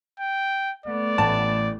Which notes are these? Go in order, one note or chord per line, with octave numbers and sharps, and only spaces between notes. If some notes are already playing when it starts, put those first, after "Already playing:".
G5
A3 B3 D5
A1 E4 A5